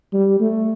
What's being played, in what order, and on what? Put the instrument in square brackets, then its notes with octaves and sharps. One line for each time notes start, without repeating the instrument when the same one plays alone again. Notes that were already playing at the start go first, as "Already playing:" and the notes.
[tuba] G3
A3